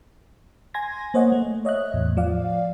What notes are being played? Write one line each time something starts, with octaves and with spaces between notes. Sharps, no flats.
G#5 C6 G#6 A#6
A#3 C5 C#5 D#5 F#5
A3
C#5 D#5 E5 F#6
E2 A2
F3 D5 F5